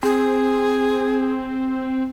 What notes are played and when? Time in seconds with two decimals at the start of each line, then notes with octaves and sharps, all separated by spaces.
0.03 C4 G#4